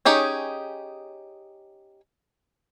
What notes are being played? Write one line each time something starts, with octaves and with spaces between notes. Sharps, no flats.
C#4 D#4 G4 G#4 C#5